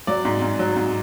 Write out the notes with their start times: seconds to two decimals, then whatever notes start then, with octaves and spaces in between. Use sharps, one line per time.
0.07 F#3 D5
0.25 G#2
0.42 G#2
0.59 F#3
0.76 G#2